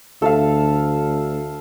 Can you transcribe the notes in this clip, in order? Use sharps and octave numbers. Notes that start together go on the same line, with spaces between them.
D2 A4 E5 F5